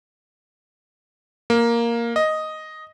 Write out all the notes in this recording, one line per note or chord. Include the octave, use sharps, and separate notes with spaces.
A#3
D#5